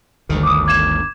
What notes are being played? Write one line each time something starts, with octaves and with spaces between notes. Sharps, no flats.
G1 D2 D#3
D6 D#6
D6 G#6 E7